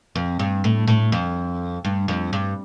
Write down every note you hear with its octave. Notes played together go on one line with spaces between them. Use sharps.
F2
G2
A2
A2
F2
G2
F2
G2